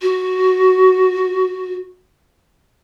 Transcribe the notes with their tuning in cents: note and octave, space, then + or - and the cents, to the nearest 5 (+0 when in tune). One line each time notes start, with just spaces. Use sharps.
F#4 +5